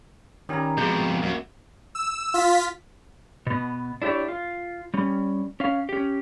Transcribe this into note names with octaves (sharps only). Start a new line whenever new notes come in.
D#3 G3 C#4 G#5 A#5
F2 B2 G#3 G6
F#2 F#3 A#3
E6
F4 B6
B2 B3
D4 E4 G4 A#4 C#5
F4
G3 C#4
C#4 F5
C#4 G4